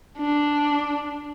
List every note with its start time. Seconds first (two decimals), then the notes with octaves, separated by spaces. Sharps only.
0.18 D4